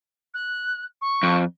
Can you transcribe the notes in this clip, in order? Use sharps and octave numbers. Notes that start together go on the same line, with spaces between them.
F#6
C#6
F2